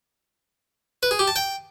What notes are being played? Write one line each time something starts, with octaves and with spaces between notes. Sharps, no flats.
B4
G#4
G4
A5
G5